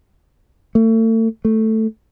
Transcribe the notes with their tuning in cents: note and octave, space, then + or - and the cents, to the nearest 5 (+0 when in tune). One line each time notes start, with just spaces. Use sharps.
A3 +35
A3 +5